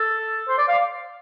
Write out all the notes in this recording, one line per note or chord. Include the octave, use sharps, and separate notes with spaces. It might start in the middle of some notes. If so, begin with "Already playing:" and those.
Already playing: A4
C5
D5
F5